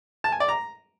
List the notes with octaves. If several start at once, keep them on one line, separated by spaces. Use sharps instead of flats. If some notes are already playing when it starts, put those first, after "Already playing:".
A5
G#5
D5
A#5